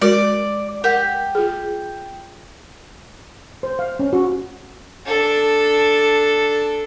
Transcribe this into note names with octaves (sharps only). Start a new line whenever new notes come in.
G#3 F#4 A#4 D5
G4 A#4 F#5
F4 G#4
C5
F5
C#4
F#4
D4 A4